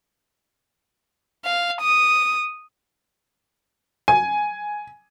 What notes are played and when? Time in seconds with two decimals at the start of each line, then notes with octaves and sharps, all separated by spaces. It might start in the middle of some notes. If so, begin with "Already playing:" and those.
1.45 F5
1.82 D#6
4.08 G#5